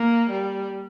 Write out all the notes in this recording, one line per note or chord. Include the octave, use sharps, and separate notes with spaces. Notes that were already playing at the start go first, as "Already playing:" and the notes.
Already playing: A#3
G3